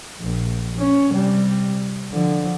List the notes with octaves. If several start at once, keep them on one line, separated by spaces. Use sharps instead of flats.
A#1
C#4
C3 G3
D3 F3